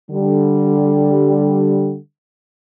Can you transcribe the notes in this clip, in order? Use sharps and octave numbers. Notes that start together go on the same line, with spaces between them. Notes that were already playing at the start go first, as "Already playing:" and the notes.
D3 G3